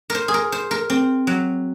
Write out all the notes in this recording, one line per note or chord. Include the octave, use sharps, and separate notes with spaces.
A#4 C5
G#4
A#4
C5
A#4
C4
F#3